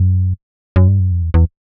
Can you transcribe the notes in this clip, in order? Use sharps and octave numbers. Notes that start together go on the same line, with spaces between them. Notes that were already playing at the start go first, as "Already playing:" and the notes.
Already playing: F#2
F#2
G2
F#2
F2
E2
E2